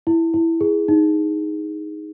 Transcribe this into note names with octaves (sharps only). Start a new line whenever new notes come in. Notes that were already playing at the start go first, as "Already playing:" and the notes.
E4
E4
G#4
D#4